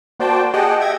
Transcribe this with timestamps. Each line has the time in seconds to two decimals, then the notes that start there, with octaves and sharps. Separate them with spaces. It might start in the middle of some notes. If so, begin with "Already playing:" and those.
0.20 A#3 F#4 C5 D5 G5 A5
0.53 G4 G#4 D#5 F#5 G5 A5
0.80 E5 G5 G#6 A#6